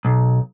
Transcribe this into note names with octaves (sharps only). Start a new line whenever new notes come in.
B1